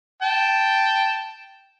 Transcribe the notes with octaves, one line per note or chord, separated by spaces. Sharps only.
G5 A5